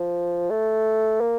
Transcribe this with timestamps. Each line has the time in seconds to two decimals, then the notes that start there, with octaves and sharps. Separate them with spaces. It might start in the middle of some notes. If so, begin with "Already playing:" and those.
Already playing: F3
0.50 A3
1.21 A#3